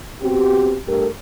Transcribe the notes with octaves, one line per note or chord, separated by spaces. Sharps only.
B3 C4 F#4 G4
G2 A3 G4 A4 A#4